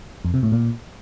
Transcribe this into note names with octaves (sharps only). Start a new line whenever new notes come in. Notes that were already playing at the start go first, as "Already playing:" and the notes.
F2
C3
A2
A#2